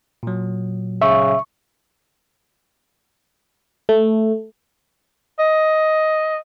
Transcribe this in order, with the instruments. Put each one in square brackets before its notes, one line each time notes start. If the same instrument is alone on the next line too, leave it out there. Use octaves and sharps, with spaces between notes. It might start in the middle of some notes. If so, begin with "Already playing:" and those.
[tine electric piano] A#2 F#3
[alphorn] C#3 [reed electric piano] E5 [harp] C#6
[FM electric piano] A3
[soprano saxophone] D#5